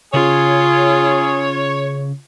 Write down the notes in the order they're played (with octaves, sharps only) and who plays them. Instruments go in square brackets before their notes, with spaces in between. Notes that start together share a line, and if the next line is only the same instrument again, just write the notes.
[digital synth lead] C#3 [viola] F4 [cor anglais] G#4 [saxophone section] C#5